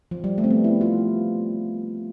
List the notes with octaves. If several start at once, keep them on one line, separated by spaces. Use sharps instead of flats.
F3
G3
A3
C4
B3
E4
F4